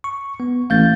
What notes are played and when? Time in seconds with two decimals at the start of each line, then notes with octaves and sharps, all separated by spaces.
0.04 C#6
0.40 B3
0.70 A1 F5 G6 A6